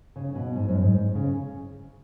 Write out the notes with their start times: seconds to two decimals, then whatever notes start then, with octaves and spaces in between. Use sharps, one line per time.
0.16 C#3
0.35 B2
0.55 G#2
0.68 F#2
0.81 G#2
1.15 C#3